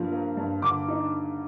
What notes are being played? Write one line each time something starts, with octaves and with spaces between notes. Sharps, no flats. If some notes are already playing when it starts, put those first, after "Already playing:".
Already playing: G2 F3 A#3
A#3
G2
D3 D6
D#4